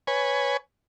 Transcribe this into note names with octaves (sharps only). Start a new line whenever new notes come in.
B4 C#5 G#5